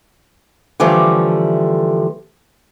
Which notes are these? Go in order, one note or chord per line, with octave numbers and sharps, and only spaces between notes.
D3 E3 F3 G3 A3